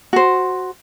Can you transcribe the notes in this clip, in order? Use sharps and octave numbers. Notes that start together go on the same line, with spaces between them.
F#4 C5